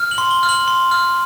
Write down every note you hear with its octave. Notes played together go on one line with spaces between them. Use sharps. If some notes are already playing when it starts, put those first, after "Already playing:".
Already playing: F6
F#7
C6
G7
F6
F#7
C6
F6